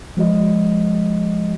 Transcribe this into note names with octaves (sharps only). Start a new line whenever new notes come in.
F3 G#3 F#4 D#5